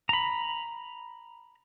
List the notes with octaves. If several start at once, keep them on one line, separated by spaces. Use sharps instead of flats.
A#5 B5